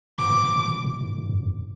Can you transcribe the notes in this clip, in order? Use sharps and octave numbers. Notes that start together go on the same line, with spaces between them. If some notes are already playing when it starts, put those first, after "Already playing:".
G#2 D6
A2
A2
A#2
B2
A#2
G#2
G#2
F#2
F2